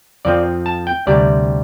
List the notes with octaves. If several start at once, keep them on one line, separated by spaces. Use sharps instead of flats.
F2 F3 C4 D5
A5
G5
D2 C3 G3 D5